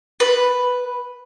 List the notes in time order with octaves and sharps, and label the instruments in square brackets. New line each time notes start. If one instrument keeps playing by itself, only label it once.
[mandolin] B4